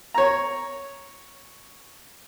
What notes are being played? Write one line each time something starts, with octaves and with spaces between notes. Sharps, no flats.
C#5 A#5